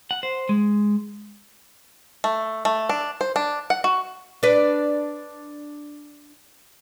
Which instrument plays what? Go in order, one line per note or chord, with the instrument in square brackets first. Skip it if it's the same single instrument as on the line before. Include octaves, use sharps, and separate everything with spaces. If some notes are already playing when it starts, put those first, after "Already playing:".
[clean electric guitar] F#5
C5
G#3
[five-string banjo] A3
A3
D4
C5
D4
F#5
F#4
[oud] D4 B4